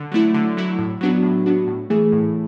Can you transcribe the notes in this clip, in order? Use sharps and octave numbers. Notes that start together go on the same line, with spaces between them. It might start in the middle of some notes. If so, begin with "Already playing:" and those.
Already playing: D3
F#3 A3 E4
D3
F#3 A3 E4
A2
F#3 B3 D4 F#4
A2
F#3 B3 D4 F#4
A2
E3 A3 E4 G#4
A2